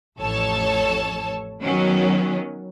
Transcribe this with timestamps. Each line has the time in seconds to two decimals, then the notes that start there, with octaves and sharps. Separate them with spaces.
0.19 A1 F2 A4 C#5 A5
1.62 D#3 F#3 B3 C#4